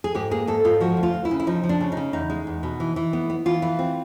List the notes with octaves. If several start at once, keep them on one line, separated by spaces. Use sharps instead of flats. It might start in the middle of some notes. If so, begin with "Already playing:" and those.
G#4
G#2 G4
A#3 G#4
G#2 A4
G#2 F4
F3 F#4
D2
F4
D2
E4
C#3
E4
F3 D#4
F3
D4
C#3
D#4
C#3
E2 D#4
G#3
E2
B2
E3
E3
B3
B3
E3 F4
E3
C4